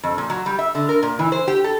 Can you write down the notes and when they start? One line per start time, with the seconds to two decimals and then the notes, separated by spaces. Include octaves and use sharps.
0.03 F2
0.18 A#2
0.30 F#3
0.46 G3
0.59 E5
0.75 D3
0.89 A#4
1.03 A#2
1.19 E3
1.32 C5
1.48 G4
1.64 A4